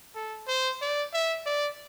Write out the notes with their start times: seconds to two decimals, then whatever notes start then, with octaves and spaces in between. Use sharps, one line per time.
0.15 A4
0.48 C5
0.81 D5
1.13 E5
1.45 D5